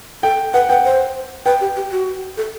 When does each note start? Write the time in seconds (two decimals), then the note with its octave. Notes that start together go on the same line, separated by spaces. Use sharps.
0.23 A4 G5
0.53 B4 F#5
0.69 B4 G5
0.85 C5
1.45 B4 G5
1.61 G4
1.76 G4
1.92 F#4
2.37 A4